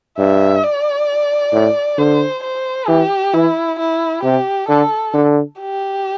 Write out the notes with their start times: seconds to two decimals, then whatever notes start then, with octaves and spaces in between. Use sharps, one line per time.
0.19 G2 E5
0.64 D5
1.53 A2
1.98 D3 C5
2.44 C5
2.89 E3 G4
3.34 E3 E4
3.79 E4
4.23 C3 G4
4.68 D3 A4
5.14 D3
5.59 G4